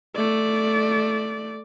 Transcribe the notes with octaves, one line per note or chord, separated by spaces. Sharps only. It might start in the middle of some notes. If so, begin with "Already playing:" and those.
A3 D5